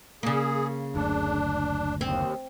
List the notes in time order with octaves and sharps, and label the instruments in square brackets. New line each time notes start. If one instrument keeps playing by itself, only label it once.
[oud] C#3 A#3 [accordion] G#4
[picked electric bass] F#1 D2 [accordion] D4
[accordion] D#2 [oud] C4